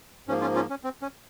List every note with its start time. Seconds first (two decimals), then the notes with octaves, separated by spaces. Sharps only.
0.27 G#2 F3 A#3 C#4
0.41 C#4 F4
0.55 C#4 F4
0.70 C#4
0.84 C4
1.02 C#4